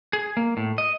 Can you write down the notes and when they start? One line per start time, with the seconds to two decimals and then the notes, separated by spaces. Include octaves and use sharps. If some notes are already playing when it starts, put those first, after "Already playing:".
0.13 G#4
0.37 A#3
0.57 A2
0.78 D#5